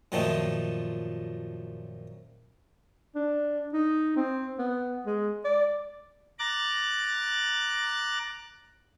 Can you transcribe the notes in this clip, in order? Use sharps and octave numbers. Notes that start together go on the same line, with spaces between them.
F#2 A#2 D#3 F3 A3 D#4
D4
D#4
C4
B3
G#3
D5
A#5 D6 F#6 A6